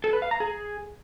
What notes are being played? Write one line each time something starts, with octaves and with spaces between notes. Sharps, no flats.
A4
B4
F5
A#5
G#4